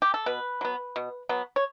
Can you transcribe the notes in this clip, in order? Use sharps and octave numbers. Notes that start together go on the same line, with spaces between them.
G4
A4
B2 B4
F#3 B3
B2
F#3 B3
C#5